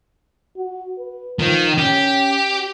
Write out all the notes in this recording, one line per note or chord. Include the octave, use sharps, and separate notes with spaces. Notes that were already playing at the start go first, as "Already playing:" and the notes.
F#4
B4
D#3 F3
C#4 G4